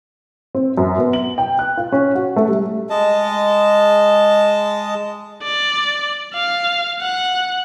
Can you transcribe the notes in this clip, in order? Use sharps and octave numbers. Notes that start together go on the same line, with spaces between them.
C4
F#2
B3
F#7
G5
F#6
F4
C#4
F#4
A3
G3
G#3 D#5 A5
D5
F5
F#5